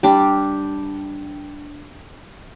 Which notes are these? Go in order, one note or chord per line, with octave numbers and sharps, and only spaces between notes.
G3 D4 G4